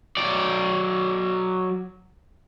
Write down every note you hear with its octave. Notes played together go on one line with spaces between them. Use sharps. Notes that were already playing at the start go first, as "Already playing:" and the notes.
F#3 D5